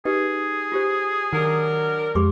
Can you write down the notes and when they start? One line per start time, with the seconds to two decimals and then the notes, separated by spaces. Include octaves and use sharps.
0.05 D#4 G4 G#4 B4
0.72 F4 G4 C5
1.33 D#3 F#3 D4 A#4
2.15 F2 G#3 G4 C6 D6